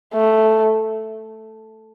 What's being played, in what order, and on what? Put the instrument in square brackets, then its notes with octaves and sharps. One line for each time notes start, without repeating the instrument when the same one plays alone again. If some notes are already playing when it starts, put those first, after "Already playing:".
[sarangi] A3